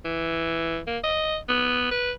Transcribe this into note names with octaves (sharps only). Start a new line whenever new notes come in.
E3
A#3
D#5
B3
B4